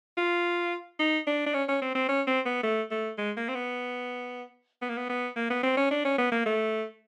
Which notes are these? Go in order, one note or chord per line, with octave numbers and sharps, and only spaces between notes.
F4
D#4
D4
D4
C#4
C#4
C4
C4
C#4
C4
B3
A3
A3
G#3
A#3
C4
B3
B3
A#3
B3
B3
A#3
B3
C4
C#4
D4
C#4
B3
A#3
A3